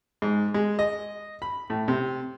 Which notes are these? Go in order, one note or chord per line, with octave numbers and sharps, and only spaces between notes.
G#2
G#3
D#5
B5
A2
C3